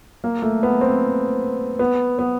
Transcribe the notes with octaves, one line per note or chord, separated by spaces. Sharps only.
A#3
A3
B3
C4
B3
B3